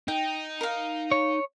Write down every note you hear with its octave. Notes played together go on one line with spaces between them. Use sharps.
D#4 G5
A#4 F5
C#5